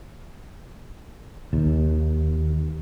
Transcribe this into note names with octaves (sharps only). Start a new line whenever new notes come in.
D#2